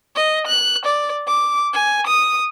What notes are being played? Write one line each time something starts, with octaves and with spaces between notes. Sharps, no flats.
D#5
F#6
D5
D6
G#5
D#6